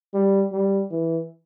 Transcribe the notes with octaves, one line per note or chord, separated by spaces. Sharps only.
G3
G3
E3